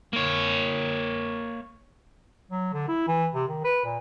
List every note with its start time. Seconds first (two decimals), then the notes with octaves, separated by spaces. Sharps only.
0.13 A#3 C#5
2.51 F#3
2.73 D3
2.88 E4
3.08 E3
3.34 C3
3.48 D#3
3.64 B4
3.85 A#2